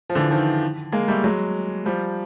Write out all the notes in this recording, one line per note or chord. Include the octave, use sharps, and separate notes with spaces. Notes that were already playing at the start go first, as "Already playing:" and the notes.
F3
D3 E3
D#3 F3
G#3 A#3
G3 A3
F#3 G#3
F3 G3